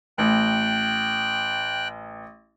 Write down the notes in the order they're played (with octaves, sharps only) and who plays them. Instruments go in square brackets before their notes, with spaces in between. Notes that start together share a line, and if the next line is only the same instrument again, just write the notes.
[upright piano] A1 [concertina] G5 F#6